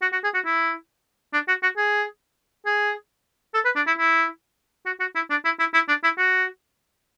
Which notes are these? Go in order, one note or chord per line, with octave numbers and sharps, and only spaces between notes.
F#4
F#4
G#4
F#4
E4
D4
F#4
F#4
G#4
G#4
A4
B4
D4
E4
E4
F#4
F#4
E4
D4
E4
E4
E4
D4
E4
F#4